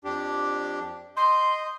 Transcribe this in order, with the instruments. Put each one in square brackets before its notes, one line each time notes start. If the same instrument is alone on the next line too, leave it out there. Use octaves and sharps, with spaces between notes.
[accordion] F2 D4 G4
[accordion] D#5 G6 [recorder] C6